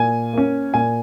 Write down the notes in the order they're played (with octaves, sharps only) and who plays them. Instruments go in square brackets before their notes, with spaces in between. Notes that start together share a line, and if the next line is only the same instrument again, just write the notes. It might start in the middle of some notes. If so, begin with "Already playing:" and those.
Already playing: [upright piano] A#2 G#5
A#3 C#4
A#2 G#5